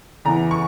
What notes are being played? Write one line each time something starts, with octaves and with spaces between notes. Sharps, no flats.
E2 C#3 E3 A#5
C#6